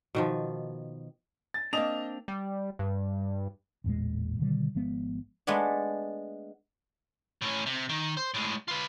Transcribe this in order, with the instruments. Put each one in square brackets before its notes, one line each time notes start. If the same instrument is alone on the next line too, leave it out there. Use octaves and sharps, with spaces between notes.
[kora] B2 D#3 F3
[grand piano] A6
[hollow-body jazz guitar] A#3 C4 D4 [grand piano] D#5 F7
[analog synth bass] G3
G2
[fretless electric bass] A1 E2 A#2 G#3
B2 D3 D#3 G3
G#1 F3 G#3 B3
[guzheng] G#3 A3 B3 D4
[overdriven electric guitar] A2 C#4
C3
D#3
C5
A2 G#3
F4 B4